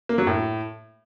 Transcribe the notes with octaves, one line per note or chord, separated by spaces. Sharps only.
A#3
F#3
A2